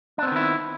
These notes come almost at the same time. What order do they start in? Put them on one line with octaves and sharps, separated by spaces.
D4 C4 B3 D#3 E4